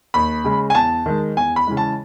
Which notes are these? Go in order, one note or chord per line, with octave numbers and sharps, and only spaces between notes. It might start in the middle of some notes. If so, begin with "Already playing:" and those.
D#2 B5
C#3 G#3
G#5
E2 A5
D#3 G#3
E2 G#5
B5
C#3 E3 G#3
A5